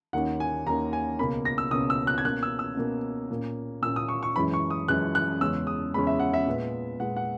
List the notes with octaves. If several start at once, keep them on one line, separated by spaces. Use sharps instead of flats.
D#2 D#3 A#3 C#4 F#5
G#5
D#2 D#3 A#3 C#4 A#5
G#5
C#2 B2 A#3 C#4 B5
A#6
E6
C#2 B2 A#3 C#4 D#6
E6
F#6
G#6
B2 A#3 C#4 F#6
E6
E6
B2 A#3 C#4
A#2 A#3 C#4
A#2 A#3 C#4 E6
D#6
C#6
C#6
F#2 E3 G#3 C#4 B5
C#6
D#6
F#2 E3 G#3 C#4 F#6
F#6
E2 C#3 G#3 C#4 E6
D#6
E2 C#3 G#3 C#4 B5
E5
F#5
E5
A#2 G#3 B3
A#2 G#3 B3 F#5
F#5